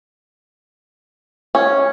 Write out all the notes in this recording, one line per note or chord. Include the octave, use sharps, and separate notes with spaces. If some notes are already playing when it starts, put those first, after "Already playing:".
C#4